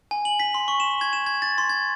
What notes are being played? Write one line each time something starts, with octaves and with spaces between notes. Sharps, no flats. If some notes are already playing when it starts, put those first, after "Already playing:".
G#5
F#7
B6
C6
C#6
E7
G#6
E7
G#6
A6
C6
G#6